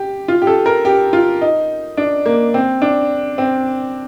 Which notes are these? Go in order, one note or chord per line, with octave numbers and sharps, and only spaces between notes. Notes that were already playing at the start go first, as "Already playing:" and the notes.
Already playing: G4
F4
G4
A4
A#4
G4
F4
D#4
D4
A#3
C4
D4
C4